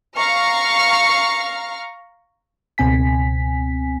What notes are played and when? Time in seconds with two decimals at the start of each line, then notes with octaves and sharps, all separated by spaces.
0.18 F5 A#5 C#6 F6
2.78 C#2 B2 C4 G#5 B6